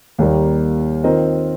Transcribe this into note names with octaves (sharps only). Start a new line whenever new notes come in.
D#2 D#3 G3 A#3
D#3 C4 F4 A#4 D#5